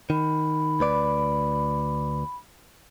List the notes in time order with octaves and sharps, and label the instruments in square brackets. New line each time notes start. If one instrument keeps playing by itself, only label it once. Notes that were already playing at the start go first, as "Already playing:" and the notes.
[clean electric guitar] D#3 [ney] B5
[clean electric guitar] D2 B4 D5